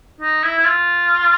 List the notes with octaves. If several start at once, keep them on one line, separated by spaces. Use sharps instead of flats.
D#4
E4
E4
F4